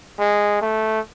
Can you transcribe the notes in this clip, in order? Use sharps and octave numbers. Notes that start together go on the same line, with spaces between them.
G#3
A3